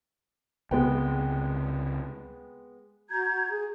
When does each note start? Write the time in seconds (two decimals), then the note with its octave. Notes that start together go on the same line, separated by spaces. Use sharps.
0.71 C#2 C3 G#3 B3 G5
3.10 F#4 A#5 G6 G#6
3.50 G#4